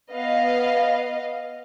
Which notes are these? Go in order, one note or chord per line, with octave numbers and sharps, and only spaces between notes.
B3 D#5 F5